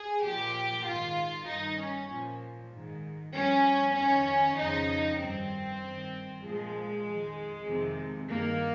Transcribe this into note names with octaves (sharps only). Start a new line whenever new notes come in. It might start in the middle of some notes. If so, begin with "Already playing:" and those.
Already playing: G#4
A#2 F3 G4
G#2 D#3 F4
G2 D#3 D#4
C#4
A#2 F3
G#2 D#3
G2 F3 C#4
F2 D#3 C#4
F2 C#3 F3 D#4
G2 D#3 C4
G2 D#3
A#2 F3 G#3
F2 D#3
F2 C3 D#3
G2 D#3 A#3